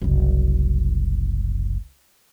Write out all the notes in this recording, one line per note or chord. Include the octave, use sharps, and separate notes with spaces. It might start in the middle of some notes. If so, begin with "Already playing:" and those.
F#1 C2